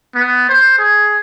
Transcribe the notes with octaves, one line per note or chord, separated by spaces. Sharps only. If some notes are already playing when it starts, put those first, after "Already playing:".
B3
C5
G#4